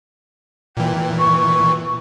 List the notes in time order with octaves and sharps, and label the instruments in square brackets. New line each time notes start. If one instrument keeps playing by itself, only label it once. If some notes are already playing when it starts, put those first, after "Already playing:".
[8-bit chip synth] A#2 E3 [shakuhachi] G5
[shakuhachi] C#6